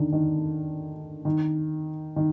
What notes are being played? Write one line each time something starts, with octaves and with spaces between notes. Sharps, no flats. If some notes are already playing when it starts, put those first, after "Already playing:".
Already playing: D3 D#3
D#3
D#3
D#3